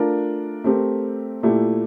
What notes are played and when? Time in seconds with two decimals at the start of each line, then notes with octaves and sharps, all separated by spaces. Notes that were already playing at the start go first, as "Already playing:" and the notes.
Already playing: A3 D4 F4 A#4
0.64 A3 C4 G4 A#4
1.43 A#2 A3 E4 G4